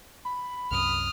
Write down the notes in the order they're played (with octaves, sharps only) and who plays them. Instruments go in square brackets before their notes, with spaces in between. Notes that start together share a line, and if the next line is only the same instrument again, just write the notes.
[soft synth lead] B5
[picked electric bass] C2 F#2 [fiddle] D#6 F6